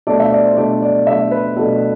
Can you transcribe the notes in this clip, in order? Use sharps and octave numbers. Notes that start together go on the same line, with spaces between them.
B2 A3 D4 D5
E5
D5
C5
B2 A3 D4 D5
D5
B2 A3 D4 E5
B4
B2 A3 D4 A4